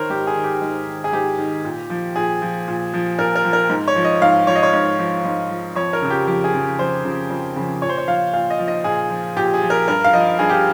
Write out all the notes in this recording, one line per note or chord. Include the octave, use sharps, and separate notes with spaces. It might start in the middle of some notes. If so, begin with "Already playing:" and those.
Already playing: D#3 A#4 C5 C#5
G#2 G4
G#4
D#3
G4
G#2
D#3
G#4
G#2 G4
D#3
A#2
F3
A#2 G#4
F3
A#2
F3
A#2 A#4
A#4
F3
A#4
G#2
C#5
F3
D#5
G#2 F5
F3 C#5
D#5
C#5
G#2
F3
G#2
F3
F2 C#5
A#4
C#3 F3
G4
F2 G4
G#4
C#3 F3
F2 C5
C#3 F3
F2
C#3 F3
A#2 C#5
C5
C#5
F3 F5
A#2 F5
D#5
F3
D#5
A#2 G#4
F3
A#2 G4
G#4
F3
A#4
G2 A#4
F5
F3 D#5
G2 G#4
G4